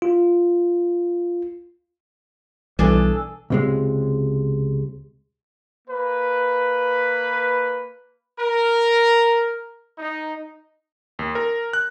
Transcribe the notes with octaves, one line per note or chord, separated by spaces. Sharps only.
F4
B1 E3 G3 D4 G#4 A4
C#2 C3 G#3
A#3 B4
A#4
D#4
D#2
A#4
F#6